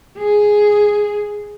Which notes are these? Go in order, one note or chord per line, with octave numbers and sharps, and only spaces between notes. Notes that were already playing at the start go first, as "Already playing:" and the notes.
G#4